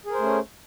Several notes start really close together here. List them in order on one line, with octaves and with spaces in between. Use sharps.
G#4 A#4 C5 A3 C#4